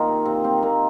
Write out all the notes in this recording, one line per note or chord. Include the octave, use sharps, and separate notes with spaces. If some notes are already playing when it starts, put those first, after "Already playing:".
Already playing: D#3 A#3 C4 D#4 F4
C3
C3 C4
A#3 C4
D#3 A#3